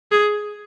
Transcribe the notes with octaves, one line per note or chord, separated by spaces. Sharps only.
G#4